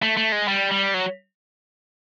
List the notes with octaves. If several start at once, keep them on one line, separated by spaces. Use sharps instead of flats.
A3
A3
G#3
G3
G3
F#3